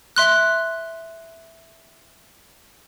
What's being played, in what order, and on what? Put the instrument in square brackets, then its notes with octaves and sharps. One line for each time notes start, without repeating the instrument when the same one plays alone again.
[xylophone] E5 C6 F#6